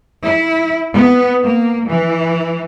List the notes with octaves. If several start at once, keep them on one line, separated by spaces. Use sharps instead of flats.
E4
B3
A#3
E3